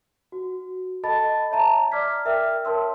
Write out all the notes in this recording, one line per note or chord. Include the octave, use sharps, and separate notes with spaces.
F#4
A4 D#5 A5 B5 A6
C#5 E5 A5 A#5
D5 D6 F6 G#6 B6
A#4 E5 G5 E6 F6
A#4 C#5 A5 C6 E6